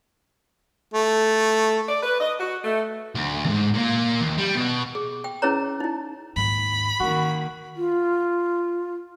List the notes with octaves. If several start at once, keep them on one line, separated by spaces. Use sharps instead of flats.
A3
D5
B4
D#5
F#4
A3
D2
D#2 G#2
A#2 A#3
D#2
G3
B2
G#4
G5
C#4 E4 G#4 B4 C#5 A#5
D#4 E4
D#2 G#2 B5
D#3 A#3 C#4 F#4
F4